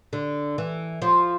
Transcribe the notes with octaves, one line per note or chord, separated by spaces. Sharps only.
D3
E3
F3